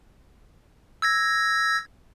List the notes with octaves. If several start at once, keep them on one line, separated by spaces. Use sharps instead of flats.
E6 G#6 A#6